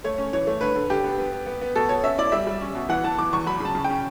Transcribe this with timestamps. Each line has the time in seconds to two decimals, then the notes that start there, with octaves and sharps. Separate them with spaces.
0.04 A3 C#5
0.18 C#4
0.33 E3 C#5
0.47 A3
0.61 D3 B4
0.75 D3
0.90 D3 G4
1.04 B3
1.18 B3
1.32 B3
1.47 B3
1.61 B3
1.76 B2 A4
1.89 B2 C#5
2.04 C#4 E5
2.18 E4 D5
2.32 G3 E5
2.47 G3
2.61 C#4
2.75 B2
2.89 E3 F#5
3.04 E3 A5
3.19 E3 D6
3.33 E2 C#6
3.46 F#3 B5
3.60 C#3 A5
3.75 C#3
3.85 G5
3.90 C#4